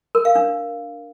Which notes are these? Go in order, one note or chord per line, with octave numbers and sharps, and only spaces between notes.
A#4
F5
D4